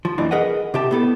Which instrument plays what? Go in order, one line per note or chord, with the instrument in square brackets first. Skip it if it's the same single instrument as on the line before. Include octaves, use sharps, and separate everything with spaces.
[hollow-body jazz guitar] F3
F2 A#2 E3 D4
G#4 A#4 B4 D#5 F#5 G#5
C3 G4 A5
A2 B3 A4